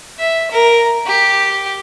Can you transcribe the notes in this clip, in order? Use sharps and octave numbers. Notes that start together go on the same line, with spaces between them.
E5
A#4
G4